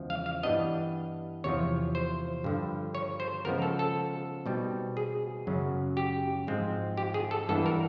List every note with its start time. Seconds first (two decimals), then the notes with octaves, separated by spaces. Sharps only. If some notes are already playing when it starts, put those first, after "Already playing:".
Already playing: E2 C#3 F3 G#3
0.10 F5
0.26 F5
0.43 G2 E3 G3 B3 D4 D#5
1.44 E2 C3 F3 C#5
1.95 C5
2.44 G2 D3 F3
2.95 C#5
3.20 C5
3.45 C#3 F3 G#3 B3 A#4
3.62 A4
3.79 A4
4.46 B2 G3 C4 D#4
4.97 G#4
5.47 F#2 C#3 F#3
5.97 G4
6.47 G#2 F3 G#3 C4 D#4
6.97 G4
7.14 G#4
7.31 A4
7.49 G2 E3 G#3 B3 D4 A4
7.66 A#4